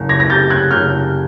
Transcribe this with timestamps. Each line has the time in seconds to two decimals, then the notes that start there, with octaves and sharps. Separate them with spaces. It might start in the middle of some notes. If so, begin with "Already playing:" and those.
Already playing: F#1
0.09 G#6 A#6
0.20 A#6
0.30 C3 G6 A6
0.50 F#6 G#6
0.71 F#1 F6 G6